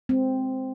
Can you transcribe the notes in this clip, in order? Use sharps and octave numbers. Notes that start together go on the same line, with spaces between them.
G#3 C4